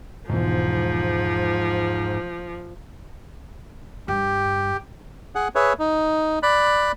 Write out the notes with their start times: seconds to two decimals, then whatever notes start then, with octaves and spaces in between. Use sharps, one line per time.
0.29 E1 B1 E2 G#2 F3
4.08 G2 G4
5.35 G#4 F#5
5.55 G#4 B4 C#5 E5
5.79 D#4
6.43 D5 B5 F#6